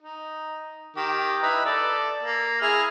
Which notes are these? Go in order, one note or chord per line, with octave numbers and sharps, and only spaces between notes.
D#4
D#3 G4
D#4 E4 B4
A4 D5
A#3
E4 G#4 F6